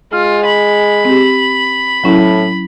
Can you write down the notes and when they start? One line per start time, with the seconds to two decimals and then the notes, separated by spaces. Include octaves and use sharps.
0.13 G#3 F4 F6
0.45 B5
1.05 C4 G4
2.04 A2 F#3 C#4 E4